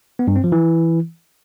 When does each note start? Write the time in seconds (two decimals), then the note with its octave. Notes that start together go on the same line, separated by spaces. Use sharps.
0.19 B3
0.27 G2
0.36 C4
0.44 F3
0.52 E3